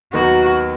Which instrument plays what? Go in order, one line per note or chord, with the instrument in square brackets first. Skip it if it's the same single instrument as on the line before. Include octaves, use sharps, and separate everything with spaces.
[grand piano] D#2 D#3 F#3 B3 D#4 [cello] F#4